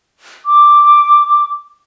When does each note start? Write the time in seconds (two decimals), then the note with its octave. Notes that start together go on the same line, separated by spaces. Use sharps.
0.46 D6